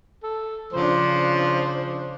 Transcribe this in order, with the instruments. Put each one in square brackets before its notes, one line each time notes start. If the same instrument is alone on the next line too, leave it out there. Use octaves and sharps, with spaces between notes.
[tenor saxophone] A4
[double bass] C#3 D4 [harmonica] F3 [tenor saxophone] C5